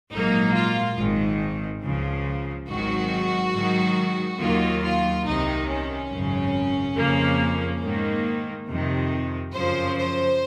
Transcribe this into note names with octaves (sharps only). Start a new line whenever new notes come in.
A#1 G#2 F#3 A#3 D#4
F4
G#1 G#2 D#3
C#2 C#3 F3
G#1 G#2 D#3 F#3 F#4
G#2 D#3 F#3
D#2 D#3 F#3 A#3 F4
F4
C2 C3 D#3 D#4
C#4
G#1 F#2 C#3
F2 C#3 F3 A#3
G#2 D#3 A#3
F2 C3 D#3
F#2 C#3 F3 C5
C5